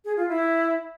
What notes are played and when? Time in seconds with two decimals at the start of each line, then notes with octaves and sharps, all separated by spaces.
0.05 G#4
0.17 F4
0.29 E4